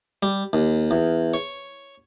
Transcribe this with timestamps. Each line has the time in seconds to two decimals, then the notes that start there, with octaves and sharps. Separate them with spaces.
0.23 G3
0.53 D#2
0.91 E2
1.34 C#5